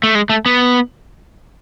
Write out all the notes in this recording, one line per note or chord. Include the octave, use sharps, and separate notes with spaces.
A3
G#3
A3
B3